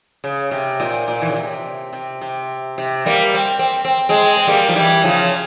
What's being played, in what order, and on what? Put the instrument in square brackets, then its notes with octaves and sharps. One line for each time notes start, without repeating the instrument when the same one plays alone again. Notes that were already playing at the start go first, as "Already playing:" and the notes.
[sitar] C#3
C3
A#2
A#2
E3
C#3
C3
C3
C3
C3
G3 A#3
C4
C4
C4
G#3 C4
C4
G3 A#3
F3
E3 G3
C#3 F3